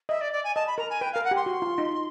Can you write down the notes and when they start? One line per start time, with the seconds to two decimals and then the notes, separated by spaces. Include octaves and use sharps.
0.09 D#5 E5
0.21 D5
0.32 D5
0.44 G#5
0.55 D#5 A5
0.67 B5
0.78 A#4 A#5
0.90 G#5
1.01 B4 G5
1.13 F5
1.16 A#4
1.24 F#5
1.31 G4 C6
1.46 F#4
1.62 F4
1.78 D#4